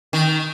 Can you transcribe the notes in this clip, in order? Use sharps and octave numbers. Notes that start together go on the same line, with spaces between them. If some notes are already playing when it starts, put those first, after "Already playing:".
D#3